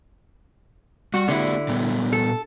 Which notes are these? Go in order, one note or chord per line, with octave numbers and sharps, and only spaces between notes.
G3 F#4 D5
D3 A#3 E4 F#4 G4
A#2 G3 B3
A4